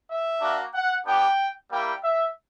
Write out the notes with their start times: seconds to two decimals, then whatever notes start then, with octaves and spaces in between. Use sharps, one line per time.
0.09 E5
0.41 A#3 D4 F#4
0.74 F#5
1.05 B3 D4 G4 G5
1.70 G3 A#3 E4 G4 G5
2.03 E5